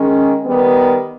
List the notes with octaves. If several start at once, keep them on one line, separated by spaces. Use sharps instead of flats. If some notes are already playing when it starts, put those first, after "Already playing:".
Already playing: D#3 G#3 C#4
D#3 G3 B3